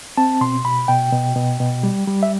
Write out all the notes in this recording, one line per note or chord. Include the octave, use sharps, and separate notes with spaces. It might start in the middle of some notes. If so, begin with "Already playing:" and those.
C4 A5
B2 C6
B2 B5
B2 G5
B2
B2
B2
G3
G3
E5